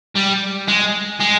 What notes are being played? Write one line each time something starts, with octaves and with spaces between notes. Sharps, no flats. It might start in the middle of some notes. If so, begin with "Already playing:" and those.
G3
G#3
G#3